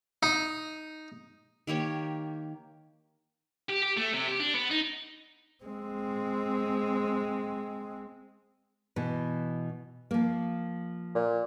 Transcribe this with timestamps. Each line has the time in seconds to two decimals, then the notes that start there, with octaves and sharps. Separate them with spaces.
0.23 D#4
1.67 D#3 A#3 G4 C#5
3.70 G4
3.83 G4
3.97 A3
4.14 C3
4.28 G4
4.40 D4
4.55 B3
4.71 D#4
5.64 G#3 C4
8.96 B2 E3
10.11 F3 A#3
11.15 A#2